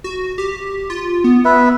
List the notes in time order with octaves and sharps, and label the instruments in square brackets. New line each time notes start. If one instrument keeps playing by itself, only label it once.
[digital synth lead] F#4
G4
F4
B3
[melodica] B4 E5